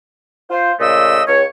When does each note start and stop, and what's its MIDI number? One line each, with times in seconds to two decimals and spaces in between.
0.50 0.72 65
0.50 0.72 72
0.80 1.22 46
0.80 1.22 49
0.80 1.22 57
0.80 1.22 75
0.80 1.22 88
1.28 1.43 37
1.28 1.43 73